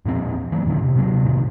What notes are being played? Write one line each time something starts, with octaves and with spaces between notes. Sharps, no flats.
E1 A#2 F3 C4
E3 F#3 G#3 A#3
F2 A#2 D3 D#3
C3
C3 F#3
A2 C3 D#3